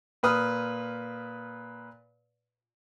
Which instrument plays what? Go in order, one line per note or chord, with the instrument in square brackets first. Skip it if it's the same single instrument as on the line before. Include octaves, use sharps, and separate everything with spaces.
[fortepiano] A#2 B4 D#6 F6